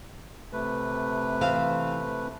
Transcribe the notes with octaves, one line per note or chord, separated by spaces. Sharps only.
C3 A3 B4
E3 C5 F5